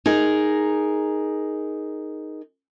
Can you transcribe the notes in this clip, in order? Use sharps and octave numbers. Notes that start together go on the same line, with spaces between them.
D#4 G#4 A#4